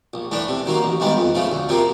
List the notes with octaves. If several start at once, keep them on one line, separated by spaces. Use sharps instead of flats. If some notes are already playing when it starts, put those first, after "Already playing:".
A#1
A2 E3 A3 D4
C3
D#3 F#3 A#3
A1
G2 D#3 G#3 B3
F2
C#3 F3 A3
D2
C3 F3 A#3